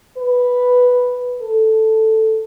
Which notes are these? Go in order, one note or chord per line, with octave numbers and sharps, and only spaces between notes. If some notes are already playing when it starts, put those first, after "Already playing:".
B4
A4